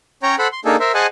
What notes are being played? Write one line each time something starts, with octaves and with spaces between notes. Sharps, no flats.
C#4 C#5 G5 A#5
A4 C5 F#5 B5
C6
A#3 D4 D#4 G#4 A4
A#4 C5 E5
G#4 C5 D#5 F#5 G#5 A5